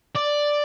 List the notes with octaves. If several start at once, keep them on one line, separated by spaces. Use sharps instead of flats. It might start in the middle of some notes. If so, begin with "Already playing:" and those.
D5